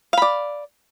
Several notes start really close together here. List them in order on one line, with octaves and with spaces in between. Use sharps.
F5 B5 D5